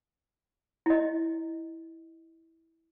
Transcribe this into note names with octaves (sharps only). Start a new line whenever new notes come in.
E4 D#5